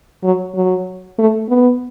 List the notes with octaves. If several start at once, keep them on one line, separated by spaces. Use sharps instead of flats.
F#3
F#3
A3
B3